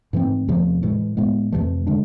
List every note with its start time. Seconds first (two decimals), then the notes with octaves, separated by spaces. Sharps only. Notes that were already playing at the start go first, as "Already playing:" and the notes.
0.13 G#2 E3 A3 C4
0.48 E2 C3 F3 A3
0.83 A2 E3 G#3
1.17 A2 G#3 B3
1.52 F2 C3 E3 A3
1.87 D3 G#3 D4